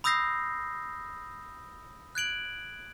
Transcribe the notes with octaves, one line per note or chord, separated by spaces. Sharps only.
B5 D#6 E6 G6 A#6 C7
F#6 G#6 D7 F#7